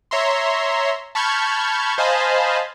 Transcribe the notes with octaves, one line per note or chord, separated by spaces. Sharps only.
C#5 E5 A#5 C6
A5 B5 C#6 F6 G6 G#6
C5 D#5 F5 G#5 A5 B5